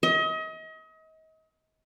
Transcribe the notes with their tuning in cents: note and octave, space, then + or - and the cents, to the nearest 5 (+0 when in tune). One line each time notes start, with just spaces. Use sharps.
D#5 +35